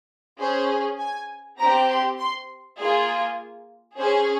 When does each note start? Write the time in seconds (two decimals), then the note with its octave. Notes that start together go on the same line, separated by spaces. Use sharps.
0.39 C#4 G#4 C5
0.99 G#5
1.59 C4 G4 A#5
1.89 C6
2.19 C6
2.78 A#3 F4 G#4
3.98 C#4 G#4 C5